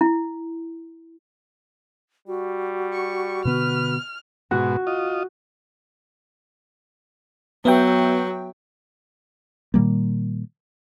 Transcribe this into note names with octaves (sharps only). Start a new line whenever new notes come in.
E4
G3 F#4
C#6
B2 D3 B3 B4 F6
G#2 B2 F#4
F4 D#5
F#3 B3 E5 G5
A#2 D#3 G3 A#3